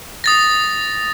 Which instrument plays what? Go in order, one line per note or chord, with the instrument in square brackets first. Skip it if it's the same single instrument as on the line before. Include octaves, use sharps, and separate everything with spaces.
[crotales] D#6 A6 A#6